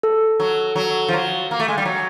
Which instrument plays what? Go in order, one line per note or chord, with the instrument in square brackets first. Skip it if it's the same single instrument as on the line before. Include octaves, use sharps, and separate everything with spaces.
[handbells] A4
[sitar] F#3
F#3
F3
F#3
A#3
A3
G#3
G3
F#3